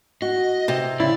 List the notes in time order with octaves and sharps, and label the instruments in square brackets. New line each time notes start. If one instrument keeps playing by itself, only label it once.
[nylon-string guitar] F#4 [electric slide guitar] D#5
[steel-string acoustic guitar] C3
[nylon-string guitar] C#3 [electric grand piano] E4 [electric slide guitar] D5